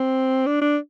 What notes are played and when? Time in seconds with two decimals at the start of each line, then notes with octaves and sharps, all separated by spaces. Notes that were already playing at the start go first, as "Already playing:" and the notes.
Already playing: C4
0.46 D4
0.61 D4